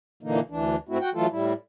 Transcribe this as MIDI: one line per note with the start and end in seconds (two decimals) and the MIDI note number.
0.23 0.40 46
0.23 0.40 50
0.23 0.40 52
0.23 0.40 58
0.23 0.40 63
0.50 0.76 38
0.50 0.76 52
0.50 0.76 62
0.89 0.98 44
0.89 0.98 57
0.89 0.98 60
0.89 0.98 64
0.89 0.98 66
1.01 1.10 66
1.01 1.10 78
1.01 1.10 79
1.14 1.27 52
1.14 1.27 54
1.14 1.27 57
1.14 1.27 65
1.14 1.27 69
1.30 1.53 45
1.30 1.53 55
1.30 1.53 64